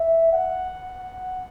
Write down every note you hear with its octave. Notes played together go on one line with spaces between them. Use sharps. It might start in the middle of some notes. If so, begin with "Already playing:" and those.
Already playing: E5
F#5